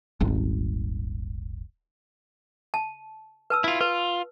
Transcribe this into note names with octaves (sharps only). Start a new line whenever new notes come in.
D#1 G#1
A5
B4 A5 E6
E4 F4
F4 B4